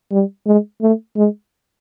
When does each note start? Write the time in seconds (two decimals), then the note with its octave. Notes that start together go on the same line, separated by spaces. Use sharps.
0.12 G3
0.46 G#3
0.82 A3
1.16 G#3